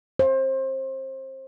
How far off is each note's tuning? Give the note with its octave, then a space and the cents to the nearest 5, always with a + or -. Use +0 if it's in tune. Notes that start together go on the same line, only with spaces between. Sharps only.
C5 +25